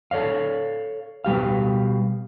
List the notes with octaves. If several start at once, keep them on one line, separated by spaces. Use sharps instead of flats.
A4 C#5 D5 F5
B2 G3 G4 F5